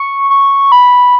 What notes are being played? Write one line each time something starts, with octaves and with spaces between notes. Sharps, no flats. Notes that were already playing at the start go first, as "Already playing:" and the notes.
Already playing: C#6
C#6
B5